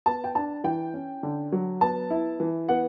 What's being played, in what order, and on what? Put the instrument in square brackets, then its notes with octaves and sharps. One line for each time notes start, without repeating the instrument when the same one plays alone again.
[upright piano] B3 A5
G5
D4 A5
E3 G5
C#4
D3
F#3
B3 A5
E4
E3
B3 F#5